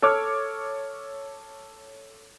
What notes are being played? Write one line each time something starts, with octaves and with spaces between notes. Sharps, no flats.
A4 C#5 D6 F6